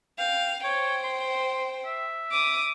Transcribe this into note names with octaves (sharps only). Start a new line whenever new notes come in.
F5 G5
C5 C#5 G5
C6
E5
D6 D#6